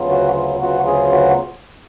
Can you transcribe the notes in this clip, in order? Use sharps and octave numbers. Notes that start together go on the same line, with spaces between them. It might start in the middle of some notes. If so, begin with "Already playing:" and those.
Already playing: D2 C#3 F#3 B3 F4
F#4
F4
D2 C#3 F#3 B3 F4 F#4
G#4
F#4